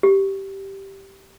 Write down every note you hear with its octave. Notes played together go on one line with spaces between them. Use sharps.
G4